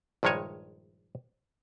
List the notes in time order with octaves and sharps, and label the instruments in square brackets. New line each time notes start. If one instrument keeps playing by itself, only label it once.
[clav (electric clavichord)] A#1 G2 D#3 G#3 C#5 G#5